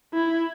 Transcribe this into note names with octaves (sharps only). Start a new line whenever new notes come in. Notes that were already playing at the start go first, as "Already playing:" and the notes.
E4